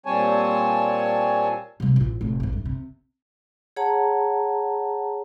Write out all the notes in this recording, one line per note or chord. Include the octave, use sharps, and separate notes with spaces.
A#2 G3 C4 C#5 G#5 A5
C3 G3
A1 F4
F1 A2
A1 A2
G2
C3
G#4 C#5 F#5 A5 A#5